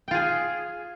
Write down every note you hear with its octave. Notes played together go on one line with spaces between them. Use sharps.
F4 G#4 G5